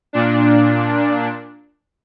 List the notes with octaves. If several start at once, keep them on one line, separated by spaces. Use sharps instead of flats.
A#2 D4